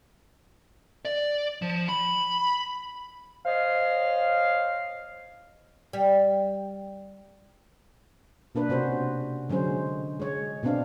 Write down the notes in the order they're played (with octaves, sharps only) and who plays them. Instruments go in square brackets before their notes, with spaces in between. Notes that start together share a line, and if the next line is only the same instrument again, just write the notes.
[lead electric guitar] D5
F3
B5
[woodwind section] C5 C#5 D#5 F5
[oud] G3
[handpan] B2 A#3 D4 B4
C3 C#4 F#4 C5
D3 F#3 G#3 C#4 C5
G#3 C#5
B2 B3 C4 D4 F5